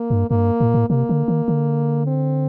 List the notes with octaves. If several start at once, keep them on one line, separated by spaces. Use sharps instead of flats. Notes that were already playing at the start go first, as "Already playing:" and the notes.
Already playing: A#3
G2
G2 A#3
A2
A#2
A2
C3 A#3
D3
D#3
D3
C4